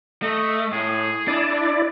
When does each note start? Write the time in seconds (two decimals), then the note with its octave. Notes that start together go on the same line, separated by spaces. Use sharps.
0.23 A3 D#5
0.72 A2 G#4
1.28 D4 E4 D5